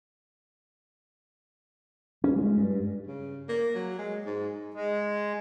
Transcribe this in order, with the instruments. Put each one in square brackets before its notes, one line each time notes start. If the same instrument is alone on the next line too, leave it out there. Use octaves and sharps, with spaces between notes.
[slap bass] C#4
G#3
G2
[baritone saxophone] C#3
A#3
F#3
G#3
G#2
[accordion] G#3